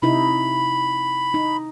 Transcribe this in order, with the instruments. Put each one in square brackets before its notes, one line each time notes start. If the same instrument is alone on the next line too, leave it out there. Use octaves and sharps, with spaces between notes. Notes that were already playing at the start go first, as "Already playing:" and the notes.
[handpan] C3 D#4 E4 [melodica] B5
[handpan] D#4